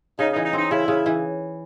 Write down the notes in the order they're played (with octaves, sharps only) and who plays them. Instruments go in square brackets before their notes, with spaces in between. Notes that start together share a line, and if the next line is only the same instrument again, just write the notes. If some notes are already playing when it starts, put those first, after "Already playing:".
[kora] C#3 [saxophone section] D#4
[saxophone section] D#4
[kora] E3
[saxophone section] D#4
[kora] C4
[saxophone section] D#4
[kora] C#3 [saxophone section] E4
[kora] C#3
E3